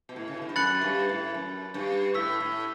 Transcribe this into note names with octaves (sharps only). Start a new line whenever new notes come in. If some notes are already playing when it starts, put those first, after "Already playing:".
B2
A2
C#3
B2
A2
G2
F#2 B5 F#6 A6 C#7 F#7
G2
A2
F#2
G2
A2 C#6 E6 B6
A2